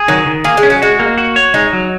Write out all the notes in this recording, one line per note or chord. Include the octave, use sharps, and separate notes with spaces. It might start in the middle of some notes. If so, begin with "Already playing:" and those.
Already playing: G#4
D#3 F#3
D#3
A#3 G#4
G#3
C#4
F#3
G#3 F#4
A#3
F#4
C#5
G#3 D#4
F#3